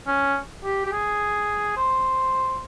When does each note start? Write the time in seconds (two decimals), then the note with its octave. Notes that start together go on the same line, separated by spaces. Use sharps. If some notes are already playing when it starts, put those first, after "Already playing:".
0.07 C#4
0.64 G4
0.86 G4
0.92 G#4
1.77 C5